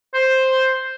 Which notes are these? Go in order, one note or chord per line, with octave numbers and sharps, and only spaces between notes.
C5